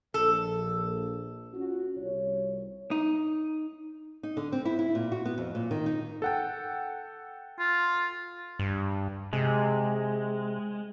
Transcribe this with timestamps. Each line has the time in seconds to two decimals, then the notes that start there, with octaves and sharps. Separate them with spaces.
0.14 A#1 A4
1.53 C#4 F4 F#4
1.97 C2 C#5
2.91 D#4
4.23 D#4
4.37 D3
4.52 C4
4.65 E4
4.79 E4
4.95 A#2
5.12 F#4
5.25 B3
5.38 F2
5.55 A#2
5.71 D#3
5.86 D#4
6.22 A4 F#5 G5
7.59 F4
8.59 G2
9.33 C3 G#3